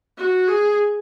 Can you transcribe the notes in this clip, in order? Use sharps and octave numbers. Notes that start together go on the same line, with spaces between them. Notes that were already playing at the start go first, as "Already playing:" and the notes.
F#4
G#4